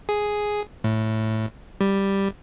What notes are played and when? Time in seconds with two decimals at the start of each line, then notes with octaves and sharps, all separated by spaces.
0.09 G#4
0.84 A2
1.81 G3